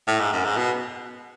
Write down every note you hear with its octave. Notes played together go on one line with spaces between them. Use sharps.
A2
G#2
F#2
G#2
B2